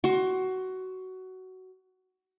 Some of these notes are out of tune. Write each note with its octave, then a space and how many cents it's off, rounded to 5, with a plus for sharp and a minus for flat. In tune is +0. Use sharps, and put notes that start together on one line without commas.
F#4 +15 C6 +25